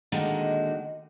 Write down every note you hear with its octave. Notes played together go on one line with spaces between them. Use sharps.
A#2 D3 D#3 G#3 D#4 F#4